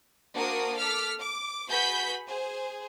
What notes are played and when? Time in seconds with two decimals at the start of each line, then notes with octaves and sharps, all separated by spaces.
0.34 A#3 D4 F#4 A#4 C5 D#6
0.76 A4 D6 F6 B6
1.20 D6
1.68 F#4 G#4 B4 B5 G6 B6
2.27 G#4 C5